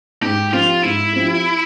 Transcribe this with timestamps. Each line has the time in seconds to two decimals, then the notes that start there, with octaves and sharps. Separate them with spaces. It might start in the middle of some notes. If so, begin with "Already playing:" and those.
0.22 G#2 G4
0.52 F3 C4 F4 G4
0.83 G#2 E4
1.13 F3 C4 G4